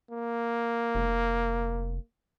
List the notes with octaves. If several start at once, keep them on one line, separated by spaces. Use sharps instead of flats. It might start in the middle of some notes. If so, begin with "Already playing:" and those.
A#3
F1